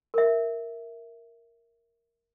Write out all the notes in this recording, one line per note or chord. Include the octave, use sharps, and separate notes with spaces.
A#4 E5